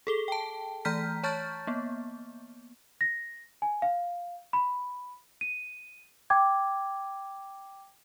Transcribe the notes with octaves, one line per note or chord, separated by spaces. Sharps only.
G#4 A4 G7
G5 A5
E3 A3 A#5 F6 G6 B6
C#5 A5 C#6 F6 G6 A6
A#3 B3
A#6
G#5
F5
B5
D#7
G5 D6 G#6